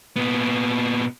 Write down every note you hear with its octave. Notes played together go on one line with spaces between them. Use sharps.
A#2 B3